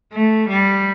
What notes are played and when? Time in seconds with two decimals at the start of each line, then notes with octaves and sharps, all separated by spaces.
0.13 A3
0.49 G3